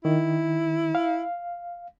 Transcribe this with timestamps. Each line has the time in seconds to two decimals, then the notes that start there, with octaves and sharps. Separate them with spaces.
0.05 D#3 E4
0.95 F5